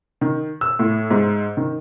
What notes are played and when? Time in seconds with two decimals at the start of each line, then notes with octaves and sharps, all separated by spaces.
0.21 D#3
0.61 E6
0.79 A2
1.10 G#2
1.57 D#3